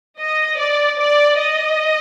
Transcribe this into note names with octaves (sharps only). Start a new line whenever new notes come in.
D#5
D5
D5
D#5